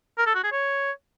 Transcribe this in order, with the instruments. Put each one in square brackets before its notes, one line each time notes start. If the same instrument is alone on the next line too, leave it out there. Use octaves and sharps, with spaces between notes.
[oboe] A#4
A4
F#4
G#4
C#5